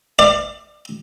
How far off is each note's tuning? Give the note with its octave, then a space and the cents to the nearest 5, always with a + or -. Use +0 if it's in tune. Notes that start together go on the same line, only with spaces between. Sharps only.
D5 +30